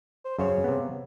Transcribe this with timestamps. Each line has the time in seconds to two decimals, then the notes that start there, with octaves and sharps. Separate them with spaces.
0.25 C5
0.38 F#2 C#3 C5 C#5
0.64 C3 B3